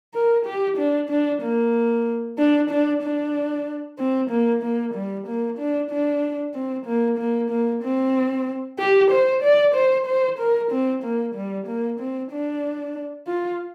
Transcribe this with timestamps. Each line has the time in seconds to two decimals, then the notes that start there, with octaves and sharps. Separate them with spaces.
0.15 A#4
0.46 G4
0.78 D4
1.10 D4
1.43 A#3
2.38 D4
2.71 D4
3.03 D4
3.99 C4
4.31 A#3
4.63 A#3
4.95 G3
5.27 A#3
5.59 D4
5.91 D4
6.55 C4
6.87 A#3
7.19 A#3
7.51 A#3
7.84 C4
8.79 G4
9.11 C5
9.43 D5
9.75 C5
10.07 C5
10.39 A#4
10.72 C4
11.04 A#3
11.35 G3
11.68 A#3
12.00 C4
12.32 D4
13.28 F4